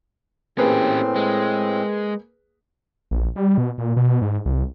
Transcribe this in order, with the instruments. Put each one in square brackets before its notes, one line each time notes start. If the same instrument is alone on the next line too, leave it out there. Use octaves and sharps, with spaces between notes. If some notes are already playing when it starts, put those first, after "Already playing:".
[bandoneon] A2 C4 [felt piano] A#3 G#4 B4 [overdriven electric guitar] C#4 G4
[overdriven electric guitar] G#3
[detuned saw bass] A#1
G3
B2
A#2
B2
G#2
C2